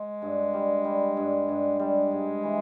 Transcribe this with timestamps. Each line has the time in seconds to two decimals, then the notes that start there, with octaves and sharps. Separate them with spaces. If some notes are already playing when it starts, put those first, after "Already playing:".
Already playing: G#3
0.22 G2
0.54 G3
0.85 G3
1.17 G2
1.49 G2
1.79 G3 G#3
2.11 G#2
2.43 E3